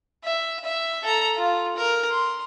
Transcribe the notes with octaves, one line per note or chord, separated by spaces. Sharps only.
E5
E5
A4 A#5
F4
A#4
C6